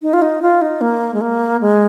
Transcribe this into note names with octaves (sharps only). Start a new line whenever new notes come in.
D#4
F4
D#4
F4
D#4
A#3
G#3
A#3
G#3